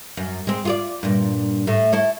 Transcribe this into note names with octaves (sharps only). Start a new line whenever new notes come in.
F#2
G#3 C4
F4 G#4 D5
G2 A#2
A2 A3
E4 A4 C#5